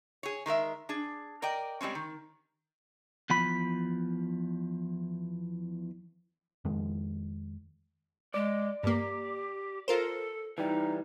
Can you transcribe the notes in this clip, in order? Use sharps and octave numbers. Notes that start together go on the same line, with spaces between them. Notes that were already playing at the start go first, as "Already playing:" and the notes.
G#4 C#5
D#3 G#3 A#4 E5
D4 G#4
A#4 D5 D#5 G5
G3 G#3 C4 C#4
D#3
E2 F3 B5
F2 D#3 G#3
G#3 D5
G2 A#3 G4
F4 A4 A#4 C5
E3 G3 D#4